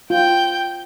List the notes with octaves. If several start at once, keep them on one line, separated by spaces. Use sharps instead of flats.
F4 G5 G6